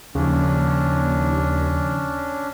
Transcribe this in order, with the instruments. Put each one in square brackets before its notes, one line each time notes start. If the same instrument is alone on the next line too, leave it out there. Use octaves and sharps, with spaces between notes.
[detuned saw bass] D#2 [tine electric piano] C#3 F3 [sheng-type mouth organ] C#4 D4